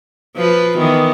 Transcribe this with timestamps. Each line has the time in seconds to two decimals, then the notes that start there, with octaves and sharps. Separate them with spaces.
0.36 F3 F4 B4
0.78 D#3 E3 B3